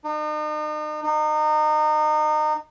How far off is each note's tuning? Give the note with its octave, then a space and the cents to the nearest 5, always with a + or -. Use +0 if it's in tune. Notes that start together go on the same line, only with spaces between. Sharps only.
D#4 -40
D#4 -30